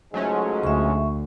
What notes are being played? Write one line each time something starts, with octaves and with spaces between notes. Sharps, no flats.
C#2 G#2 F#3 G#3 A3 C#4
D2 E5 C#6